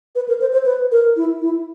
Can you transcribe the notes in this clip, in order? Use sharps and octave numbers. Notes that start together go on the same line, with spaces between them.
B4
A#4
C5
C5
B4
A#4
E4
E4